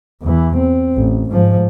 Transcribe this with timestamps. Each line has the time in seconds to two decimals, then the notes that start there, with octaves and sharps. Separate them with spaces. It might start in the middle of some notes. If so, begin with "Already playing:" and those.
0.23 E2 E3
0.57 C4
0.96 A1
1.31 G#2 F3